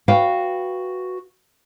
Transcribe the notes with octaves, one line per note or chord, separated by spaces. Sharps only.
F#4 B4 F5 G5